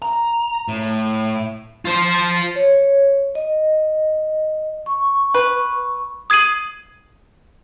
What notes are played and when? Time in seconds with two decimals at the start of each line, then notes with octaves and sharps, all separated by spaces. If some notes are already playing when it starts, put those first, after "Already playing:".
0.02 A#5
0.68 A2
1.85 F4 C5
2.56 C#5
3.35 D#5
4.86 C#6
5.34 B4
6.30 D#6 G#6 C7 D#7 F#7